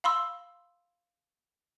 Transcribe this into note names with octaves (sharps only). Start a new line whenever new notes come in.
F5 B5 C6 E6